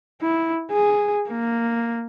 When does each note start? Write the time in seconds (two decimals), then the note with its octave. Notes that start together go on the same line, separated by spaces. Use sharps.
0.22 E4
0.72 G#4
1.30 A#3